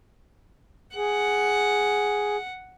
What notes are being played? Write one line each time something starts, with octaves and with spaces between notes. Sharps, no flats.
G#4 F#5